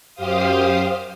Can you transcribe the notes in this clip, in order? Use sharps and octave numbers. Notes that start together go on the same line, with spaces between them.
F#2 G4 C5 F5 D#6